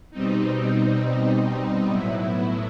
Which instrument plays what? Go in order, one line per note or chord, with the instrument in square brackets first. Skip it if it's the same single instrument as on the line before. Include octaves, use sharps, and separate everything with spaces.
[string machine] B2 G3 C4 D#4
A2 F#3 B3 E4